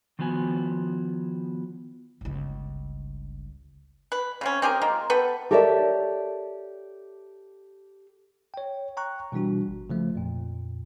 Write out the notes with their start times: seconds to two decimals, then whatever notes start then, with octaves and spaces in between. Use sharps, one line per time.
0.19 D#3 F3 B3 F#4 G#5
2.21 G1 C#2
4.12 B4
4.41 C#3 C4 C#4
4.62 C4 G4 G#4 A#4
4.82 G#3 A#3 F4
5.10 B3 A4 B4 G5
5.51 G4 A4 A#4 C#5 D5 E5
8.54 C#5 G5
8.97 G5 A#5 C#6 F#6
9.32 B2 E3 G3 D4 F#4
9.68 G#1
9.90 C#3 F3 A3
10.15 F2 A#2